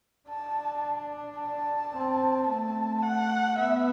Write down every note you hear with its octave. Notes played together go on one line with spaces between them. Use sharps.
D4 A5
A5
C4
A3 A5
F#5
B3 E5